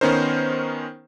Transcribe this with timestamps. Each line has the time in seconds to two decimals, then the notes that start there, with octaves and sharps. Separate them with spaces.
0.01 D#3 B3 C#4 D#4 A#4 C5